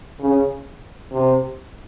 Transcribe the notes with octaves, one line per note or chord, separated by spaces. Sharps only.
C#3
C3